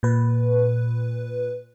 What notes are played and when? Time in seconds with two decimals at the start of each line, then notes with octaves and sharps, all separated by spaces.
0.03 A#2 B4